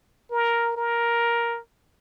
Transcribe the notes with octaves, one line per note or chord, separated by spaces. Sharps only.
A#4
A#4